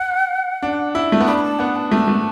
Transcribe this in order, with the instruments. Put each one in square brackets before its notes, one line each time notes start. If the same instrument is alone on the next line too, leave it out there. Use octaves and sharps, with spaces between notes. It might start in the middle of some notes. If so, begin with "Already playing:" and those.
Already playing: [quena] F#5
[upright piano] D4
E4
A3
B3
[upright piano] D4 [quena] B5
[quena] B5
A5
[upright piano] B3 [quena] F#5
[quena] A5
[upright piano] A3 [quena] A5
[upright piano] A3